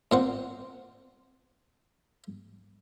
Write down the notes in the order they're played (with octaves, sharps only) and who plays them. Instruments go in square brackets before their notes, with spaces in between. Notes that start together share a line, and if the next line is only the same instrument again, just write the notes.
[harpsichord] A#2 C4 F#5